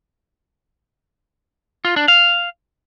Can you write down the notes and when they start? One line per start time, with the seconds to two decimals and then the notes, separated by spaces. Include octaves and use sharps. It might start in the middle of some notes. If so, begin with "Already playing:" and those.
1.85 F4
1.96 D4
2.08 F5